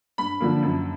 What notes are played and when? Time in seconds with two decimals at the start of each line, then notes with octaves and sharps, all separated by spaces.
0.18 G2 B5
0.40 D3 F3 A#3
0.63 F#2